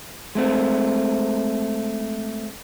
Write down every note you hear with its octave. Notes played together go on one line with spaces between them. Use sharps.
G#3 A3 C4